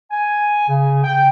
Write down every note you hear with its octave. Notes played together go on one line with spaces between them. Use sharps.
G#5
C#3
G5